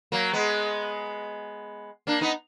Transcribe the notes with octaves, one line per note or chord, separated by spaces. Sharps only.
F#3 A#3
G#3 B3
A#3 D4
B3 D#4